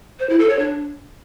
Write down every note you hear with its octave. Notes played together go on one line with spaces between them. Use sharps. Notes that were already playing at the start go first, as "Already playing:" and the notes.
C5
E4
A4
C#5
D4